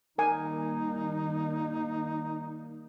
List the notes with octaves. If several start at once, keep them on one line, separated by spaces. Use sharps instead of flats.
D#3 G3 A#3 D#4 A#4 G#5